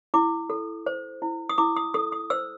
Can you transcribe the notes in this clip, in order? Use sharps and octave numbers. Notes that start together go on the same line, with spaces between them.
E4 D6
A4
C5
E4
D#6
E4 D6
D#6
A4 D#6
D#6
C5 E6